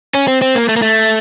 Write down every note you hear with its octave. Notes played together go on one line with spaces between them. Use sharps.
C#4
C4
C4
A#3
A3
A#3
A3